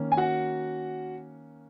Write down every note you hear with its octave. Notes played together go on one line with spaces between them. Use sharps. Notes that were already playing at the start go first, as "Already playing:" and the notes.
Already playing: D#3 A#3 C#4
G#5
F#4 F#5